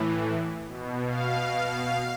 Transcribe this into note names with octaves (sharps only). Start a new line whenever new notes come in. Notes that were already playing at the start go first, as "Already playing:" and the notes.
Already playing: A2 E3
B2
F5